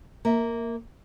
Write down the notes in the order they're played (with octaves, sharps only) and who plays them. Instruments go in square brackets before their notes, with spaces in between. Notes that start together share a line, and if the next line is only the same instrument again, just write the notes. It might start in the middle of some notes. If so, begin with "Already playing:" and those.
[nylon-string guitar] A#3 E5